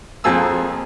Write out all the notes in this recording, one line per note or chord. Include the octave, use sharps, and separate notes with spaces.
F2 F3 A#3 G#4 A5 E6